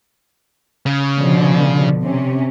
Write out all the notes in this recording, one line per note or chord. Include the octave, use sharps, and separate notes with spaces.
C#3
B2 D3 F3
C3 C#4